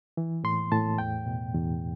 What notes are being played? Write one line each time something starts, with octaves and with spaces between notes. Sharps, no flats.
E3
A2 C6
A2 A5
E2 G5
B2
E2